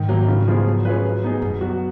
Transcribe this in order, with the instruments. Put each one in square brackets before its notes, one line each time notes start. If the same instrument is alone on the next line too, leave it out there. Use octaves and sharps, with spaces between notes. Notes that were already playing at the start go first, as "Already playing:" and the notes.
Already playing: [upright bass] G#2 [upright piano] D#3
[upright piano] F#3 A#3
C#3
F3 B3 F4 G#4
F#3
C#4 F4 G#4 B4
F#3
B3 D#4 G#4
[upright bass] F#2 [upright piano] B2
[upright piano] F#3 B3 F#4